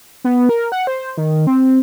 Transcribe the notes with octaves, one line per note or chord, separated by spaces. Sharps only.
B3
A#4
F#5
C5
D#3
C4